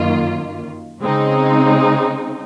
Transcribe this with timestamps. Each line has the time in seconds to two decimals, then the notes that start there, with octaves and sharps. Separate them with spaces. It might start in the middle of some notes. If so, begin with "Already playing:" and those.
Already playing: F#2 D#3 A#3 F4
1.00 C#3 G#3 C4 D#4